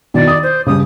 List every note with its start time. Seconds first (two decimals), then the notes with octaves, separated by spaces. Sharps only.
0.14 B2 D#3 E4 D5
0.27 D6 D#6
0.43 C5
0.66 G2 C#3 D#6